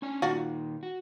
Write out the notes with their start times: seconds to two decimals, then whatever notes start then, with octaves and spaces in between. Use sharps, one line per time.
0.02 C#4 D4 G#5
0.22 A#2 D#3 F4 F#4
0.83 F#4